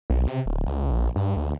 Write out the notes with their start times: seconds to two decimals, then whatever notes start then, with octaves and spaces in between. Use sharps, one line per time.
0.10 B1
0.27 C3
0.46 D1
0.67 C#2
0.91 A#1
1.16 G2
1.37 D2